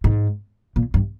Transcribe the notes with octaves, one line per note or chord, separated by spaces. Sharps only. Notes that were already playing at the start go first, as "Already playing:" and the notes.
G#2
A#2
G2